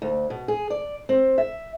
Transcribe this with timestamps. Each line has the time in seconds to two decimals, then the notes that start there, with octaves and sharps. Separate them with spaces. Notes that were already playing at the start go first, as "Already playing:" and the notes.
0.02 D2
0.30 B2
0.48 G#4
0.70 D5
1.09 C4
1.38 E5